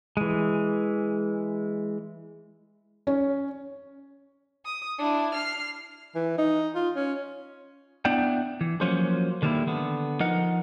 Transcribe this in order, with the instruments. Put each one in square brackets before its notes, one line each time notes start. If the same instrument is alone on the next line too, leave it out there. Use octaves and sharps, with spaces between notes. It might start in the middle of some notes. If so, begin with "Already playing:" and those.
[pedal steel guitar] E3 G#3
[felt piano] C#4
[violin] D#6
D4 E4
F6 C7
[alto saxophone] E3
D#4
F4
C#4
[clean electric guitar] B3 D4 E4 D5 F#5 G5
E3
F3 F#3 A#3 C#4 C5
D3 D#3 G3 A3 A#3 E4
D3 B3
F3 D#4 A#4 D#5 F#5